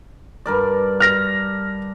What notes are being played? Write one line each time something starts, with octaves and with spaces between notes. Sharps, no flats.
G2 A#4 D5
F6 A#6